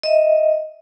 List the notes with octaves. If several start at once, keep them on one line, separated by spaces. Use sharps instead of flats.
D#5 E5